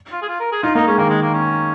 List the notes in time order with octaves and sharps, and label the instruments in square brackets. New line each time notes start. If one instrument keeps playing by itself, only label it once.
[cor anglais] F4
G#4
F4
A#4
G#4
[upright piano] D#4 [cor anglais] F4
[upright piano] A#3 [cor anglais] D#4
[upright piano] G#3 [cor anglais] C#4
[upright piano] D#3 [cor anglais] A#3
[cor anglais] G#3
A#3
C#4